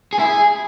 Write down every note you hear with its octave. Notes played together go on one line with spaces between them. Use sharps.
G#4
E4
G#4